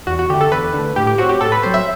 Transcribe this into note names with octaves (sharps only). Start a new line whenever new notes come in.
E2 F#4
F#4
D3 A3 G4
A4
E2 B4
D3 A3
A2 G4
G4
F#3 C4 F#4
G4
A2 A4
B4
F#3 C4 C5
E5